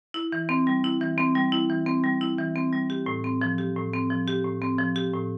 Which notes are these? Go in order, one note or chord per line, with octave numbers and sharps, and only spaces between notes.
E4
E3
C4
G3
E4
E3
C4
G3
E4
E3
C4
G3
E4
E3
C4
G3
G4
A2
C4
F3
G4
A2
C4
F3
G4
A2
C4
F3
G4
A2